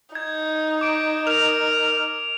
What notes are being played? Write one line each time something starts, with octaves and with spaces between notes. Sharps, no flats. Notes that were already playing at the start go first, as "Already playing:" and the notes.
D#4 G#6
D6 D7
A#4 F7